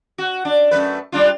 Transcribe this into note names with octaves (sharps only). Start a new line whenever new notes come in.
F#4
D4
F#2 A3 B4
G3 D4 F4